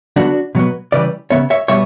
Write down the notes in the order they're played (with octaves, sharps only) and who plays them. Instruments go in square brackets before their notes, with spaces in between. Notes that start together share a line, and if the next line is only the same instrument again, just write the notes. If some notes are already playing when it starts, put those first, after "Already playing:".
[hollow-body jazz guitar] D3 F#3 B3 D4 F#4
B2 F#3 B3
C#3 E3 G3 B4 D5
C#3 E3 B3 C#5 E5
C#5 E5
B2 G3 B3 C#5 E5